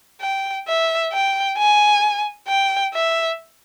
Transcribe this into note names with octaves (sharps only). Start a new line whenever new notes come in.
G5
E5
G5
G#5
G5
E5